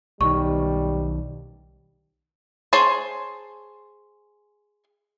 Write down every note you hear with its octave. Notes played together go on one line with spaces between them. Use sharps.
B1 D#3 G3 C#6
G#4 C5 C#5 G#5 A5